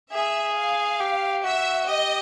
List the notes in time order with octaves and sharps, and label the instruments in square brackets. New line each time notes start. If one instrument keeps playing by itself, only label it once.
[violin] G#4 [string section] E5
[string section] F5
[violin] G4
[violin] F#4 [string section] E5
[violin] G4 [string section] D#5